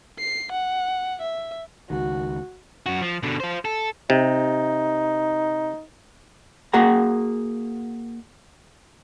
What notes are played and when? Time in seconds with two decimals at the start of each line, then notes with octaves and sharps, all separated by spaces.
0.19 C7
0.52 F#5
1.21 E5
1.90 C#2 D#3 F#4
2.86 F#2 F#4
3.01 F3
3.23 B2 D3
3.40 F4 C5
3.65 A4
4.10 C3 D#4
6.73 A#3 F#4 G#4 F#5 A#5